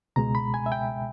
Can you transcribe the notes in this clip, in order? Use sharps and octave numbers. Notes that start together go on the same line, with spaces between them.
C#2 B2 G#3 A#5
B5
G#5
E5
G5